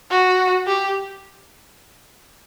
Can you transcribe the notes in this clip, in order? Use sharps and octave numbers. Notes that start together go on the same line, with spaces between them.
F#4
G4